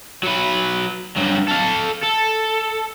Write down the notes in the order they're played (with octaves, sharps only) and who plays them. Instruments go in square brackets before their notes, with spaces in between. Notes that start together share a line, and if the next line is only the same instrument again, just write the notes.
[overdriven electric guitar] F#3 B4
G2 F#3
A4 F5
A4